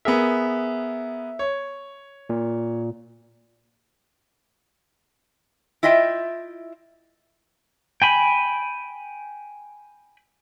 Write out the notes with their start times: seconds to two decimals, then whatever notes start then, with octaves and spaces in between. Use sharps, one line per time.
0.05 B3 G#4 A#4 E5
1.39 C#5
2.29 A#2
5.83 E4 F4 D#5 E5 G5
8.02 G5 G#5 B5